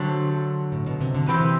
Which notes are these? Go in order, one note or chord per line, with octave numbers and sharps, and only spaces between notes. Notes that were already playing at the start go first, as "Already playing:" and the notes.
Already playing: D3 F#3 A3 D4 G4 C5
A2
B2
C3
D3
C3 E3 C4 G4 B4